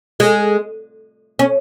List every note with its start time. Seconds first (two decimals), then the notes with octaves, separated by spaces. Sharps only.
0.20 G#3
1.39 C#4